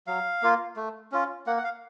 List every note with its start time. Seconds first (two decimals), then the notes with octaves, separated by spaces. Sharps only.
0.07 F#3 F5
0.42 A#3 F4
0.76 A3
1.12 C#4 F4
1.47 A#3 F#5
1.58 F#5
1.64 F5